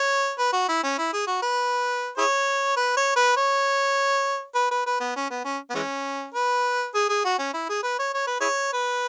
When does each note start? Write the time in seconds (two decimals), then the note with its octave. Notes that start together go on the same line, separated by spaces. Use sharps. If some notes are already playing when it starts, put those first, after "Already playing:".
Already playing: C#5
0.39 B4
0.53 F#4
0.69 E4
0.83 C#4
0.98 E4
1.13 G#4
1.27 F#4
1.42 B4
2.18 E4 G#4 C#5
2.77 B4
2.97 C#5
3.16 B4
3.37 C#5
4.55 B4
4.71 B4
4.86 B4
5.00 B3
5.16 C#4
5.30 B3
5.45 C#4
5.70 B3
5.75 E3 G#3 C#4
6.34 B4
6.94 G#4
7.09 G#4
7.25 F#4
7.39 C#4
7.54 E4
7.69 G#4
7.83 B4
7.99 C#5
8.14 C#5
8.27 B4
8.40 E4 G#4 C#5
8.73 B4